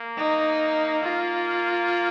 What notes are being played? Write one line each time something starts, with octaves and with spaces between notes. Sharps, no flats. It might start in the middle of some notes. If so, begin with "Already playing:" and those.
Already playing: A#3
D#4
F4